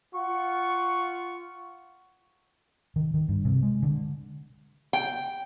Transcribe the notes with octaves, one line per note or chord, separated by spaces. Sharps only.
F4 F#5 C#6
D#3
D#3
G2
C3
G#3
D3
G5